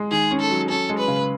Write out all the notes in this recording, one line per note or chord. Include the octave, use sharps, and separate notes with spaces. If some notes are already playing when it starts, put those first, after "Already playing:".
Already playing: G#3
D#3 G#4
C#4
A4
F#3
C#4 A4
G#3
B4
C#3